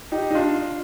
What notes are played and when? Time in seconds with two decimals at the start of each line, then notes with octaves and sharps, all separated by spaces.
0.12 D#4 G4
0.31 D#4
0.35 D4 F4